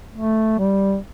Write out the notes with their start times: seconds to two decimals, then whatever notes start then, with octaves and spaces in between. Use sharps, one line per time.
0.16 A3
0.58 G3